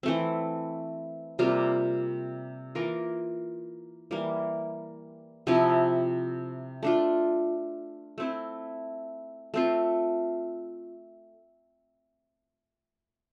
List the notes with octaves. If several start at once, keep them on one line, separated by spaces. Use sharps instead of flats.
E3 A3 C4
C3 G3 A#3 F4
E3 A#3 F4 A#4
E3 G3 A#3
C3 F3 C4 E4
A3 D4 F4
A3 C4 E4
A3 C4 F4